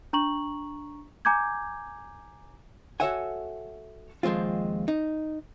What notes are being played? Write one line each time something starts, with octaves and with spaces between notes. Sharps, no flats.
D4 A#5 C#6 F#7
G#5 A#5 D6 G6 G#6
F#4 A4 C#5 E5 F#5 G#5
D#2 F3 G#3 C4 F4
D#4